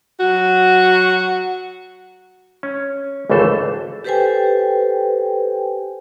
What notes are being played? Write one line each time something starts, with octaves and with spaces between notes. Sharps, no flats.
F#3 F#4
C#4
G#1 C#2 E3 A3 A4 C5
G4 A4 B4 C5 G5 G#5